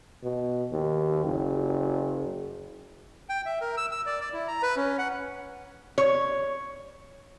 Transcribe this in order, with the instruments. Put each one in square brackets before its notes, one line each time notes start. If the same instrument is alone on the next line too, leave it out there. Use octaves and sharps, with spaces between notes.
[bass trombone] B2
D#2
F#1
[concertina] G5
E5
A#4
E6
E6
D5
D5
E4
A#5
B4
C#4
F#5
[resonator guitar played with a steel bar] C#5